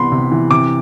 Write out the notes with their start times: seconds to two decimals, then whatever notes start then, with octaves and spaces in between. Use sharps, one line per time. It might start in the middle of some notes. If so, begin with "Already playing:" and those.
Already playing: C2 C3 E3 B3 B5 C6
0.12 C3
0.32 E3
0.51 C3 D6